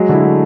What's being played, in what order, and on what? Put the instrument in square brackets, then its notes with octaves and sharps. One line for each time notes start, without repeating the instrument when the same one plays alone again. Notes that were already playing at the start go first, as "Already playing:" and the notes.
Already playing: [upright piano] F#3 G#3
D3 E4
A3